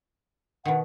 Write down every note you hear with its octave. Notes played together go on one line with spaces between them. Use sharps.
B2 D#3 F#5